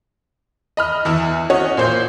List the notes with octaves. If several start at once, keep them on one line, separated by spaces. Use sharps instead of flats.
D#5 B5 F6
E2 E4
C#4 F#4 C#5 D#5
A#2 C5 G6